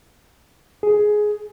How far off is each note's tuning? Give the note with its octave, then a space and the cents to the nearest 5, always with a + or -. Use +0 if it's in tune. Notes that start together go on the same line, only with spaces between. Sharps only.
G#4 +10